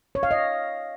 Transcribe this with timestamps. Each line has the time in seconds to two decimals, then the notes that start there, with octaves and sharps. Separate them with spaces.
0.15 C#5
0.23 F5
0.31 D#5